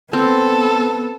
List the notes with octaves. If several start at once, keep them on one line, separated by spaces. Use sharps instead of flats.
B3 C4 A4